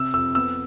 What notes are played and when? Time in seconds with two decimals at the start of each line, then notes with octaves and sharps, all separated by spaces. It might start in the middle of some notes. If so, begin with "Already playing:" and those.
Already playing: C3 E6
0.14 F2 E6
0.35 B3 E6